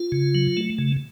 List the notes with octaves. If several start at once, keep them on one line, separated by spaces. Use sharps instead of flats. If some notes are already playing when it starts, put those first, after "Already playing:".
Already playing: F4
C#3
F#3
A3
C#3